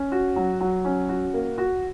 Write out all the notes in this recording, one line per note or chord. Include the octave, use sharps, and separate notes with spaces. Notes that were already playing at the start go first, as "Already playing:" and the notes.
Already playing: C#4
F#4
F#3
F#3
C#4
F#4
A#3
F#4